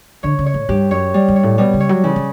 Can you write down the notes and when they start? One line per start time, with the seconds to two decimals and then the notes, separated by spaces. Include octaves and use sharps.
0.23 D3 C#5
0.39 C#3
0.46 C#5
0.54 A2
0.69 G2 G4
0.91 F#2 C#5
1.14 G3
1.28 G2
1.36 C#5
1.43 A2
1.58 B2 G3
1.74 C#3
1.80 C#5
1.89 F#3
2.04 C#3 E3
2.16 F#3